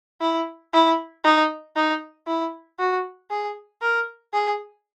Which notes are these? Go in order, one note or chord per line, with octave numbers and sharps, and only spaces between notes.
E4
E4
D#4
D#4
E4
F#4
G#4
A#4
G#4